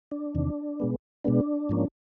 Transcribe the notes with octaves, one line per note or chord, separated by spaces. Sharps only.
D4
E2 C3 D#3
B2 G#3 B3
B2 G#3 B3 D4
G#2 F3 A#3 C#4